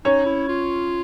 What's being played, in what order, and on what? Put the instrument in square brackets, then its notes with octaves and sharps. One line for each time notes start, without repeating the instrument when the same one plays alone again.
[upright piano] C#4 C#5 [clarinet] D#4
[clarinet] E4
F4